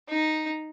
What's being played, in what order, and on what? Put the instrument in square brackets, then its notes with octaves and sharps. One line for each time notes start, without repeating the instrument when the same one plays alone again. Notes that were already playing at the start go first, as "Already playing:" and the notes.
[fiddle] D#4